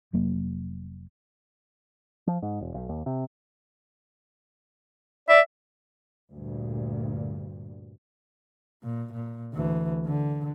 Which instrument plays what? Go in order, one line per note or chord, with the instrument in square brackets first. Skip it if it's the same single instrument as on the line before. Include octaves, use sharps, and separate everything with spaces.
[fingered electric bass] F1 F#3 A#3
[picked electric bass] F3
G#2
E1
B1
D#2
C3
[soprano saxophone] D5 [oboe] E5
[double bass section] D2 G2 A#2
[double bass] A#2
A#2
D2 E3
D3